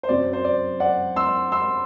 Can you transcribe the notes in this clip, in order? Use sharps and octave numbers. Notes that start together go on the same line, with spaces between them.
C5
F#2 F#3 C4 D5
C5
D5
D5 F#5
C6 E6
C6 E6